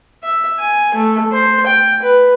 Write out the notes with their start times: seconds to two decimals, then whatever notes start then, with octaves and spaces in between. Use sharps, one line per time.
0.23 E5
0.59 G#5
0.94 A3
1.32 C5
1.66 G5
2.02 B4